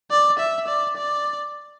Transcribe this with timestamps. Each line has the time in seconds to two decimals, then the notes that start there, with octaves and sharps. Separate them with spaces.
0.11 D5
0.39 E5
0.68 D5
0.97 D5